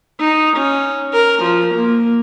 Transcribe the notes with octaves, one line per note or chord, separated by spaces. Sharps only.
D#4
C#4
A#4
F3
A#3